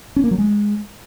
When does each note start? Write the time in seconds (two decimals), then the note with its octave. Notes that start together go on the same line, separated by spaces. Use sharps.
0.16 C#4
0.24 A#3
0.31 F#3
0.38 G#3